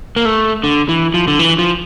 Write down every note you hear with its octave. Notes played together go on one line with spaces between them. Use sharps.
A#3
A3
D3
E3
F3
D3
E3
F3